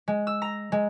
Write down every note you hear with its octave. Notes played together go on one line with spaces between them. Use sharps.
G#3
E6
A#5
G#3